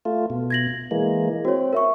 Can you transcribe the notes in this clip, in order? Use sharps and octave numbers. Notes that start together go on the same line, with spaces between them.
A3 F4
B2
G#6 A#6 F#7
E3 G#3 A#3
C4 F#4 C#5
A#4 E5 C#6